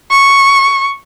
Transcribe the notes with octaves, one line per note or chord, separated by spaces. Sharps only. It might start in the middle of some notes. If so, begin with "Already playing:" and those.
C#6